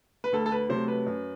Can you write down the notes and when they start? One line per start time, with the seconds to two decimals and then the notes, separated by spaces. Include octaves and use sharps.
0.24 B4
0.32 D2 A4
0.46 A4
0.52 B4
0.69 C3 F#3 A3 C5
0.88 B4
1.06 F#2